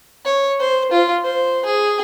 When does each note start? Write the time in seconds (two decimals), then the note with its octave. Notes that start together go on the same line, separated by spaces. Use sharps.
0.25 C#5
0.59 C5
0.91 F4
1.24 C5
1.65 G#4